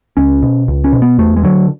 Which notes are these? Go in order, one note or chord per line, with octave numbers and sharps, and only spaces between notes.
C#2 C#4
B2
C#2
C#4
B2
B3
E2 A3
G#3
D3 F#3